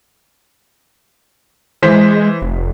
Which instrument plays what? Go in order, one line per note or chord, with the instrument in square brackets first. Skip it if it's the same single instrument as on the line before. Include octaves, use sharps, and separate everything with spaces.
[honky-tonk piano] E3 C5 B6 [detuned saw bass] G#3
[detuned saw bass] F1